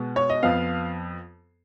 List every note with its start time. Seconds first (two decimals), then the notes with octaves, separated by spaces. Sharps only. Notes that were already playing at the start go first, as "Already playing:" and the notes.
Already playing: B2 G#3 B3
0.16 C#5
0.29 D#5
0.43 F2 F3 B3 F5